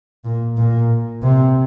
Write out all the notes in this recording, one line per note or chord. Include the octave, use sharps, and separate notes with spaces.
A#2
A#2
C3